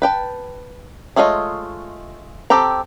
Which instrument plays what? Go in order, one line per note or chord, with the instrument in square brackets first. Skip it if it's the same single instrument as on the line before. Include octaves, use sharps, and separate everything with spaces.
[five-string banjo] B4 G5 A5
G#3 A3 F4 C#5 D#5
C4 G4 A4 G5 A#5